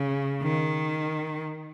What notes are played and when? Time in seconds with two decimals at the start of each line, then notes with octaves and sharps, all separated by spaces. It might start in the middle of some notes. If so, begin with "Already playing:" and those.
Already playing: C#3
0.42 D#3